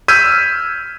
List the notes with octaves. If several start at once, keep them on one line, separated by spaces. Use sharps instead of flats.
E6 F6 G6 G#6 B6 D#7